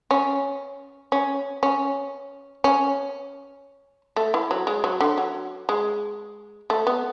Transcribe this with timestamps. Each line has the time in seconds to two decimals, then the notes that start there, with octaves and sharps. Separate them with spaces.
0.11 C#4
1.12 C#4
1.63 C#4
2.64 C#4
4.16 A3
4.34 E3
4.51 F#3
4.67 G#3
4.84 F#3
5.00 D3
5.18 F#3
5.69 G#3
6.70 A3
6.87 B3